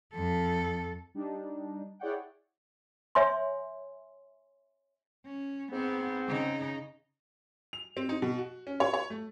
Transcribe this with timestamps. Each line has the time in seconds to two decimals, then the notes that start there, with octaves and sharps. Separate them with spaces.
0.15 F2 A4
1.14 G3 D4 D#4
1.99 E4 G#4 C#5 D5 F#5 G5
3.15 C#5 E5 G#5 C6
5.26 C#4
5.72 G#2 B3 C4
6.27 C#3 D#4
7.73 F7
7.97 C4
8.09 D#4
8.22 B2
8.38 F#4
8.67 C#4
8.80 C#5
8.94 C#5
9.10 A3